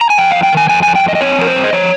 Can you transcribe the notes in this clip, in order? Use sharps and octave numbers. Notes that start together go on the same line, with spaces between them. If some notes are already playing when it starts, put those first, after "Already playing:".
A#5
G#5
F2 G5
F2 F5
G5
D#3 G#5
F2 G#5
F2 G#5
G5
F2 D#5
D#5
C4 C#5
F3 A#4
C5
G2
D#5
F3 C#5